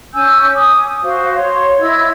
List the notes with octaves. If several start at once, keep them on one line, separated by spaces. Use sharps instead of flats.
C#4 G#5 E6 G6
G#5 D6 D#6
F#4 C5 F5
C#5 C6
E4 D#5 E6 G#6